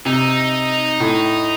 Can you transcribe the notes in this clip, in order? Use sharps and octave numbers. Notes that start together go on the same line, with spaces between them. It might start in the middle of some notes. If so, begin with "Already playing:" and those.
C3 D#4
A2